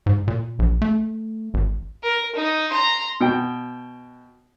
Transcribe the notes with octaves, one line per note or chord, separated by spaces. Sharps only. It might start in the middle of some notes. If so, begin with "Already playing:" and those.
G#2
A#2
A#1
A3
G#1
A#4
D#4
A#5 C6
B2 G5